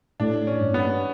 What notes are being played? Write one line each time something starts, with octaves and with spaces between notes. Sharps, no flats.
A2 D4
C#4
G2
B3